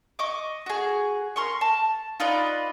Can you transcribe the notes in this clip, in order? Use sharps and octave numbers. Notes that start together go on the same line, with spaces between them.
D#5 C#6 D6
F#4 G#4
A#4 C6 C#6
A5
D#4 F4 B4 D5